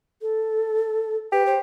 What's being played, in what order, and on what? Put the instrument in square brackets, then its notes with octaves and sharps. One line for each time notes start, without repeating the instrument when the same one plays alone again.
[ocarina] A4
[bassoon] G4 [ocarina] B4
[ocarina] C5